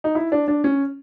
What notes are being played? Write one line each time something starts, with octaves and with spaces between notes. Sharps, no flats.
D#4
E4
D4
D4
C#4